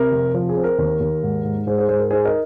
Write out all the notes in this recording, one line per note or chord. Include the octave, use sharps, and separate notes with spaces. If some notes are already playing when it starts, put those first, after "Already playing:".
Already playing: C3 A#4
F1
F3
G#4
C4
A#4
D#2
D#2
G#2
G#2
G#2 G#4 C5
G#4 C5
G#2 G#4 C5
A#4
D#4 G#4 C5
A#4 D#5